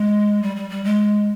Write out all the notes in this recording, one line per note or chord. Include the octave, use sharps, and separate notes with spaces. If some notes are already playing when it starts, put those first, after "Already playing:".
Already playing: G#3
G3
G3
G3
G#3